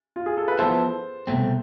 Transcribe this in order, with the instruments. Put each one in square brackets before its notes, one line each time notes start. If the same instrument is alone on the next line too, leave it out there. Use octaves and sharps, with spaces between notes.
[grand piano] F4
G#4
A4
B4
[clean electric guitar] F3 B3 E4 A4 [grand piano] C5
[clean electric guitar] C2 B2 A3 C4